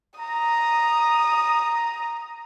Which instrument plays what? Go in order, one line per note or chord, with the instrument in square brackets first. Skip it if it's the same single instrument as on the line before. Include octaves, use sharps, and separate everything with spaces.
[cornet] A#5 [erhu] D#6